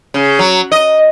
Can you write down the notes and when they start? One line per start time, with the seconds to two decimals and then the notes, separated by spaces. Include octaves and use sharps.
0.14 C#3
0.39 F#3
0.72 D#5